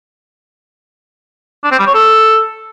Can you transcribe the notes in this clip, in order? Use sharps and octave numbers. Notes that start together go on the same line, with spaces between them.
D4
C4
G3
C#5
A4